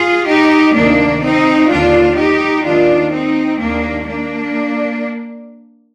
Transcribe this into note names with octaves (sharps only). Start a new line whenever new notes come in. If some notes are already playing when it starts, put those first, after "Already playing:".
Already playing: F4 G#4
D#4 G4
D2 C3 D#3 A#3 D4
C4 D#4
D#2 D3 D4 F4
D#4 G4
D#2 D#3 D4 F4
C4 D#4
D#2 D#3 A#3 D4
A#3 D4